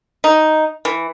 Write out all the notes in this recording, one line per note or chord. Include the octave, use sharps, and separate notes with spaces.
D#4
E3